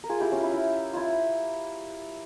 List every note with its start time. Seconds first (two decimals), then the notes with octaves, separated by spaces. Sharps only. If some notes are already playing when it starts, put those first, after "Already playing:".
0.04 A#4
0.10 F4 G#4
0.20 E4 G4
0.32 C#4 F4
0.43 E4
0.53 E4
0.93 E4 F4